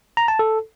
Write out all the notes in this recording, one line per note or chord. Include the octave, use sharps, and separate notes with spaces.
A#5
A5
A4